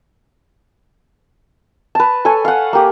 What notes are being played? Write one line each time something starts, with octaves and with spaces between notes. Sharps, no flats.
B4 A5
A4 C#5 G#5
F5 F#5
A#3 G4